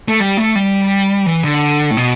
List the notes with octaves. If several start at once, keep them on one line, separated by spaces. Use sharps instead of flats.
A3
G3
A3
G3
E3
D3
A2
B2